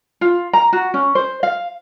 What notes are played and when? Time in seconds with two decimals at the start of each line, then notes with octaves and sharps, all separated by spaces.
0.21 F4
0.53 A#5
0.73 F#4
0.94 C#4
1.15 C5
1.43 F5